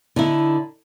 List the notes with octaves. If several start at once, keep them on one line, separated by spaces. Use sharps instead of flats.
D3 D#4 E4